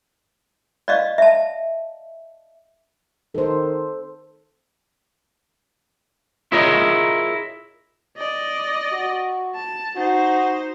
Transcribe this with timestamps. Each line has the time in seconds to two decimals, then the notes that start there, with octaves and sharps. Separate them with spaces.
0.88 D5 D#5 F5
1.18 E5 A5
3.35 D#3 A4 C5
6.52 E4 F4 G#4 A#4 C#5 D#5
8.18 D5 D#5
8.92 F#4
9.56 A5
9.96 D#4 F#4 C5